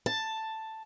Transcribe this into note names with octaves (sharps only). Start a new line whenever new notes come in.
A5